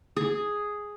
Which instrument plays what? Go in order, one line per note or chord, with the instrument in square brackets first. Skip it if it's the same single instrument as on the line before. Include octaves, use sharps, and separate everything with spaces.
[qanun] G#4